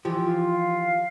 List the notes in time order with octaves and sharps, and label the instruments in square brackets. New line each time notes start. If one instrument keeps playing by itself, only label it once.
[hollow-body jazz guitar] E3 F3 G4
[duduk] F4
[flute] F5